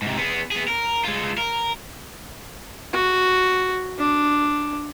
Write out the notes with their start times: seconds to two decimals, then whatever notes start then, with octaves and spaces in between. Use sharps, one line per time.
0.02 G#2 C3
0.17 B3 G#4
0.51 B3 G#4
0.68 A#4
1.04 G#3 F4
1.37 A#4
2.93 F#4
3.98 D4